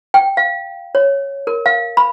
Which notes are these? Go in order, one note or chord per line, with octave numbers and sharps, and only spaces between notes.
G5
F5
C#5
A#4
F5
B5